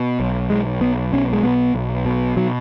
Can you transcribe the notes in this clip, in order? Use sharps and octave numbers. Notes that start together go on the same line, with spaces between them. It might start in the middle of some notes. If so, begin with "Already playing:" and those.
Already playing: B2
B1
B1 G#3
B1 B3
B2 C#4
G#3
B1 B3
B1
B2
B2 F#3